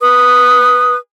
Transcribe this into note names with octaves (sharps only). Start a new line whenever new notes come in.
B4 D#6